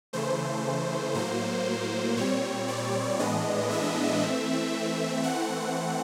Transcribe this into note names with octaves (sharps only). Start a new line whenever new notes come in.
C#3 E3 A3 C5
A2 F#3 A#3 C5
A#2 G3 C4 C#5
D5
A2 E3 G#3 B3 D4 D#5
E5
E3 A3 C4
E3 A3 C4 F#5